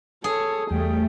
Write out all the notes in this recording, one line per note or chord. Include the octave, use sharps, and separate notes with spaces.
G#4 A4 C#5
E2 G3 A3 G5